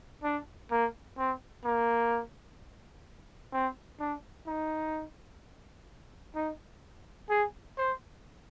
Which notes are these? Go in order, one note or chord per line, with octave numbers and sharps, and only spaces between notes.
D4
A#3
C4
A#3
C4
D4
D#4
D#4
G#4
C5